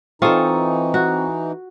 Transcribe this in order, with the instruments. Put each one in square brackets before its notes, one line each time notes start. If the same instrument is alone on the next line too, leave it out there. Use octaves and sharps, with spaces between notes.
[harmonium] E3 D#4 [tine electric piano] C4 C#6 D#6 [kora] F4 A4
[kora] F#4